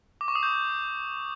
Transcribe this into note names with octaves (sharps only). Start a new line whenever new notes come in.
D6
C#6
D#6
G6